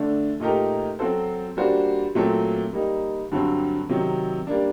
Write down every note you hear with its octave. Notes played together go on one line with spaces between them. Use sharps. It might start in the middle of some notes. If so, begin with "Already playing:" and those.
Already playing: D3 A3 D4
A#2 A3 D#4 G4 A#4
F#3 C4 F#4 A4 C5
G3 A#3 D4 F#4 C5
A#2 F#3 A3 C4
G3 A#3 D#4
G2 D3 F#3 C4
C3 D#3 F#3
G3 A#3 D4